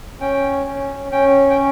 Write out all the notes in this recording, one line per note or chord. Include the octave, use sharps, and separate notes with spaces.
C#4 G5
C#4
C#4 G5
G5